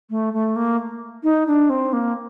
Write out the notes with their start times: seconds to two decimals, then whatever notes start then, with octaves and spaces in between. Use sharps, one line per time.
0.10 A3
0.33 A3
0.56 A#3
1.23 D#4
1.47 D4
1.70 C4
1.93 A#3